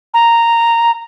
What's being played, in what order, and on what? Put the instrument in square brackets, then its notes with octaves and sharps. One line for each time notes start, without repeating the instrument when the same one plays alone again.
[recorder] A#5